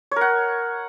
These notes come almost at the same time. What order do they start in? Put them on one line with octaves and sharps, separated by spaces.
C#5 A#4 F#5